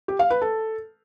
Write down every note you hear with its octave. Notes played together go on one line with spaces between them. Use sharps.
G4
F5
B4
A4